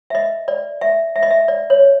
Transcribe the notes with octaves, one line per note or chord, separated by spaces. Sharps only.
E5
D#5
D5
E5
E5
D#5
E5
D5
C#5